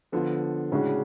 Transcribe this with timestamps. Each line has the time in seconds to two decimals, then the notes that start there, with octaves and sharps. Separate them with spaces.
0.12 D3 F3 B3 F4
0.72 A2 C#3 G#3 D4 F#4